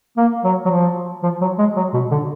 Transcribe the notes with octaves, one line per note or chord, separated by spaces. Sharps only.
A#3
F#3
F#3
F3
F3
F#3
G#3
F#3
B2
D3